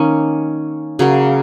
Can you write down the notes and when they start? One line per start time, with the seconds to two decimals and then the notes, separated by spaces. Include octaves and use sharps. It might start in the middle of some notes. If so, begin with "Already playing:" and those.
Already playing: D#3 A#3 C#4 D#4
0.99 C#3 F#3 A#3